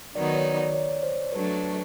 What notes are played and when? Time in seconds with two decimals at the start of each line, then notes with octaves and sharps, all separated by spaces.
0.15 D#3 F#3 B3 D#4 D5
0.35 C#5
0.54 D5
0.74 C#5
1.03 C5
1.32 F#3 A3 D4 B4